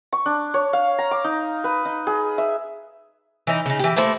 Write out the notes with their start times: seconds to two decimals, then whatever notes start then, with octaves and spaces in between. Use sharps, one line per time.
0.12 C#6
0.26 D4
0.54 C#5
0.73 F5
0.98 A#5
1.11 D6
1.24 D#4
1.64 B4
1.85 D#4
2.07 G#4
2.38 E5
3.47 E3 D#4
3.66 C#3 D#4
3.79 E3 G4
3.96 A3 A#3 E4 C5